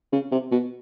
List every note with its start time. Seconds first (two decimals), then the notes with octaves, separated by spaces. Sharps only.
0.12 C#3
0.32 C3
0.51 B2